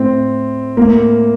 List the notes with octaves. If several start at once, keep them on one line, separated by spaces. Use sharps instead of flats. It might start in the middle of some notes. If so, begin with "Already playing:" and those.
Already playing: A2 C4
A2 A#3